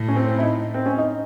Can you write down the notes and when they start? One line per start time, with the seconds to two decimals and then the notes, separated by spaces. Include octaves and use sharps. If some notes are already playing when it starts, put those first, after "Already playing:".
Already playing: A2
0.08 C#4
0.16 C4
0.39 E4
0.43 D#4
0.74 C4
0.86 C#4
0.98 D#4